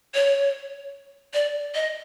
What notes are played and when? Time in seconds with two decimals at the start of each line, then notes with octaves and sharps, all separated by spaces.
0.14 C#5
1.34 D5
1.75 D#5